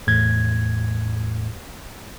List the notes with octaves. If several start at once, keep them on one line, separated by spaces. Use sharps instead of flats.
E2 A2 G#6